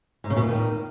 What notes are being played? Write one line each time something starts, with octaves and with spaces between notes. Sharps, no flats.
G#2
C#3
B2
A#2
D#3